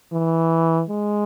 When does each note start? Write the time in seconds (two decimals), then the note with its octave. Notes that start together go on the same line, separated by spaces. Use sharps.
0.13 E3
0.90 G#3